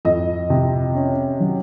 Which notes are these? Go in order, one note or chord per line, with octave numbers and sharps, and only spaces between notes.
F2 D#5
C3
C#4
F#3